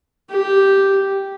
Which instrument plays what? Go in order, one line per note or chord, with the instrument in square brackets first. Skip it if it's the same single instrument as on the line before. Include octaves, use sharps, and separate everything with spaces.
[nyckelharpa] G4